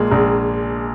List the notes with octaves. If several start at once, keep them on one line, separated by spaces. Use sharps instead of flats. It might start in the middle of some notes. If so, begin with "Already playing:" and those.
Already playing: A#1 A#2 G#3
A#1